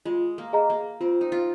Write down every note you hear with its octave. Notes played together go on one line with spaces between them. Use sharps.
G#3 F4
A#3
G#4 D#5 A#5
A#3
C4 F4
D#4
F4